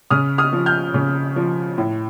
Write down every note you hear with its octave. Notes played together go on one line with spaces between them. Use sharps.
C#3 D#6 F6
D#6 F6
F3
F6 G6
C#3
F3
A2